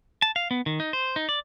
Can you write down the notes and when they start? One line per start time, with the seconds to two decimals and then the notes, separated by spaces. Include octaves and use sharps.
0.22 A5
0.36 F5
0.51 B3
0.66 D#3
0.80 D#4
0.93 C5
1.16 D#4
1.29 D5